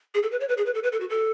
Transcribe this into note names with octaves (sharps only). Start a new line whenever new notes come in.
G#4
A4
B4
C#5
B4
G#4
B4
A4
B4
A4
F#4
A4